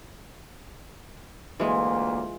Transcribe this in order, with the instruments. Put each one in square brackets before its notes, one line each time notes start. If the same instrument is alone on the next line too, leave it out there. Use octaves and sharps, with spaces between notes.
[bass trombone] D2 [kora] E3 G#3 [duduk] A#3 [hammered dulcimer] F4